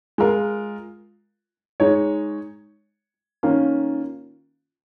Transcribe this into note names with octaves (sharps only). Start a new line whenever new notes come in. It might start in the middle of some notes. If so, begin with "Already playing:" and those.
G#3 F4 A#4
G#3 D#4 C#5
D#3 A#3 C#4 F4